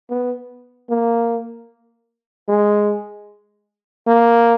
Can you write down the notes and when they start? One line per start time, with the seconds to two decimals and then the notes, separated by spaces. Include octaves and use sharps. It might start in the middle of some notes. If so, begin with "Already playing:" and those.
0.10 B3
0.90 A#3
2.48 G#3
4.07 A#3